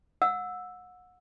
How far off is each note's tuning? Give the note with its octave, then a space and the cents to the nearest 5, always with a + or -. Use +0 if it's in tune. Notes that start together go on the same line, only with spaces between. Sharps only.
F#5 -30 E6 +0